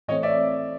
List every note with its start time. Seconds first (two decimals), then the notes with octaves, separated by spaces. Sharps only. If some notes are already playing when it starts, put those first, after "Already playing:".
0.08 A2 E3 A3 C4 C#5 D#5
0.23 D5 E5